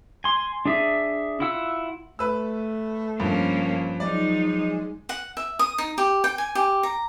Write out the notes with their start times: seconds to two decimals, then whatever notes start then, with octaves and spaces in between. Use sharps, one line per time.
0.24 G#5 C6
0.66 D4 G#4 E5
1.40 E4 F4 F#5 E6
2.19 A3 B4 E6
3.20 G2 F3 A#3 C#4
4.00 F#3 G#3 D#4 D5
5.09 F#5
5.37 E5
5.59 D#6
5.78 D#4
5.98 G4
6.24 G5
6.38 G#5
6.55 G4
6.83 A#5